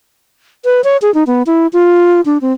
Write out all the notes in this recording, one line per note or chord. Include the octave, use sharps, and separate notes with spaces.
B4
C#5
G#4
D#4
B3
E4
F4
D4
C4